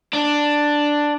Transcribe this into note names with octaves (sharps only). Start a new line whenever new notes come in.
D4